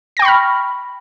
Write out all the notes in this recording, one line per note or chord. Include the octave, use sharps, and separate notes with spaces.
G5 B5 C#6 F6 A#6